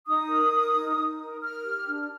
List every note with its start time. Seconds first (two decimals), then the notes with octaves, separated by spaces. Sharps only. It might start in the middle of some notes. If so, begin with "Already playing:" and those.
0.07 D#4 D#6
0.29 A#4
0.52 A#4
0.74 D#4
0.97 D#4
1.20 A#4
1.42 A#4 F6
1.64 G4
1.87 D4